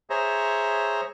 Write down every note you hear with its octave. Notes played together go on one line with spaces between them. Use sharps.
G#4 C5 C#5 E5 A#5